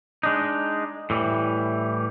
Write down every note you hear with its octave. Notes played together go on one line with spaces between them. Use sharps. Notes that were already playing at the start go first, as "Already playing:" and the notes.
G#3 D4 D#4
A2 E3 G3